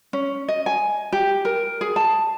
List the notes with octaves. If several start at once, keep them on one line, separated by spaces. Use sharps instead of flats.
C#4
D#5
G#5
G4
A#4
G#4
A5